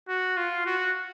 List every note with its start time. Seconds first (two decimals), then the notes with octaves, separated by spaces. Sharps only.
0.09 F#4
0.37 F4
0.66 F#4